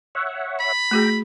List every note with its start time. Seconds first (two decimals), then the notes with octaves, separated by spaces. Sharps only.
0.15 C#5 E5 F#5
0.60 B5
0.91 A3 F#4 G#4 G5 A#5